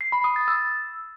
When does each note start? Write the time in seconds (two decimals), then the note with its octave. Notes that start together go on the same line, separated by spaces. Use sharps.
0.01 C7
0.12 B5
0.24 D#6
0.36 A6
0.48 E6